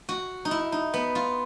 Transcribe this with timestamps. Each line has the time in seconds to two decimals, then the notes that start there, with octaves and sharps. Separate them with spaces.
0.09 F#4
0.45 D#4
0.51 E4
0.72 D#4
0.94 B3
1.15 F4